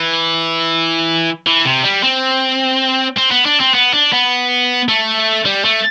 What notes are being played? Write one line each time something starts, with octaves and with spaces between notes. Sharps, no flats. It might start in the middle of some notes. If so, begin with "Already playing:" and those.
Already playing: E3
E3
C3
G3
C4
C4
B3
D4
C4
B3
D4
B3
A3
G3
A3